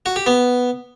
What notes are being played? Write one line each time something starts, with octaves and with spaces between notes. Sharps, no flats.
F#4
G4
B3